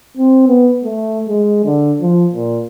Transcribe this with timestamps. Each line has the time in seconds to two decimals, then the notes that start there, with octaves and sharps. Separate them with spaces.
0.17 C4
0.48 B3
0.84 A3
1.28 G#3
1.65 D3
2.01 F3
2.33 A#2